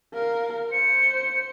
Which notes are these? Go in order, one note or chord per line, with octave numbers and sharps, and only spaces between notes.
A#4 F5
C5 C#7